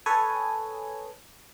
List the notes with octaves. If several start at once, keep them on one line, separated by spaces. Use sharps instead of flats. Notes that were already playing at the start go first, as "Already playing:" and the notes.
A4 B4 C#5 G#5 D#6